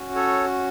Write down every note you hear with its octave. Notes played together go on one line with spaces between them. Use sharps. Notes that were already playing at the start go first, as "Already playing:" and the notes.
Already playing: C#4 F#4
A4 C#5